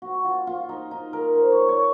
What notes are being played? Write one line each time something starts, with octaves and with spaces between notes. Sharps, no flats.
F#4
F4
F4
D#4
D#4
A#4
C5
C#5
C#5